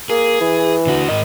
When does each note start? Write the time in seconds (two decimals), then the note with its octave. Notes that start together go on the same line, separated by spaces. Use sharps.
0.10 A#3 G#4
0.41 E3
0.87 D3 F#4
1.09 G#2 A#4 D#5